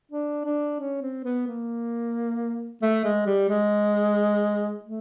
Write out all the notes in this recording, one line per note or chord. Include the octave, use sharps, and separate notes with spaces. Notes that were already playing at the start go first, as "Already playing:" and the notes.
D4
D4
C#4
C4
B3
A#3
A3
G#3
G3
G#3
A3